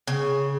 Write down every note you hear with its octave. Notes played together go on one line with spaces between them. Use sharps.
C#3